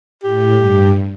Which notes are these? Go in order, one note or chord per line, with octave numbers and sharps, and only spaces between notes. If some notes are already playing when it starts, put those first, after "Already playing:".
A2 G4
G2